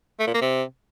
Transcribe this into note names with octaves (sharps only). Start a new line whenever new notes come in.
A3
A#2
A#3
C3